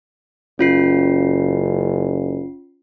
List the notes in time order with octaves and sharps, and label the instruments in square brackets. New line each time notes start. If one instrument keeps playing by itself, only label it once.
[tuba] F#1 [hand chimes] C#4 F4 C7